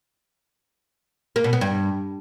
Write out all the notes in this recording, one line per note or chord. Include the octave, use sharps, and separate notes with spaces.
A#3
B2
B3
G2